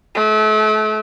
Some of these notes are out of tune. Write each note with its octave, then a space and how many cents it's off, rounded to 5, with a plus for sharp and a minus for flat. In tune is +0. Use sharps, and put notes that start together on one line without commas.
A3 -35